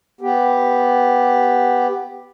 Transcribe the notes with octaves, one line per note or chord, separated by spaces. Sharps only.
B3 G4